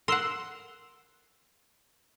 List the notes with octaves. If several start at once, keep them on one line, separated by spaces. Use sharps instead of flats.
A#4 F#5 C6 E6 C7